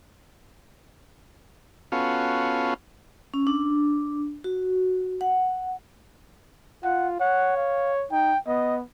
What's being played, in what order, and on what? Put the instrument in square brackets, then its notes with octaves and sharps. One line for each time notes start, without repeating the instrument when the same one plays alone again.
[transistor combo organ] B3 C#4 F4 F#4 A4 F5
[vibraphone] C#4
D4
F#4
F#5
[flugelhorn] F4 [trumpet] F#5
[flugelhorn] C#5 [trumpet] F#5
[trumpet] F5
[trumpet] D#4 [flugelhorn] G5
[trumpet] B3 [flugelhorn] D#5